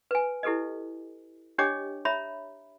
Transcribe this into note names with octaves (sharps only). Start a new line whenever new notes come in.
B4 G#5
E4 G4 A4 B4 D#5
D4 G4 C#5 D#5 G5 D6
C#5 E5 A#5 B5